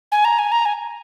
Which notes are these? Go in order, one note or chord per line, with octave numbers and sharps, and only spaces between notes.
G#5
A#5
G#5
A#5
G#5